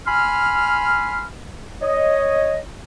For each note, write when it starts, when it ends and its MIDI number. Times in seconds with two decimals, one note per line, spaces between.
0.07 1.25 80
0.07 1.25 83
0.07 1.25 84
0.07 1.25 89
1.82 2.59 73
1.82 2.59 75